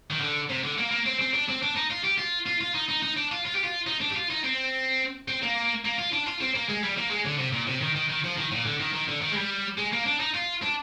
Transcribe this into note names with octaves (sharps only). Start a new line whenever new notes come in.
D#3
D3
C3
D3
A#3
A#3
C4
C4
D4
C4
D4
D#4
F4
G4
F4
F4
F4
D#4
D#4
D#4
D4
F4
F4
G4
F4
D#4
D4
G4
F4
D#4
C4
C4
A#3
A#3
F4
D4
F4
C4
A#3
G#3
G3
A#3
G#3
D3
C3
A#2
C3
D#3
D#3
D#3
F3
D#3
A#2
D3
D#3
D#3
D3
D#3
G#3
G3
G#3
A#3
D4
D#4
F4
D4